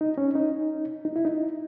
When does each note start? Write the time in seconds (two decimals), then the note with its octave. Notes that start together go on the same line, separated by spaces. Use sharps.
0.01 D#4
0.18 C#4
0.35 D#4
1.05 D#4
1.16 E4
1.25 D#4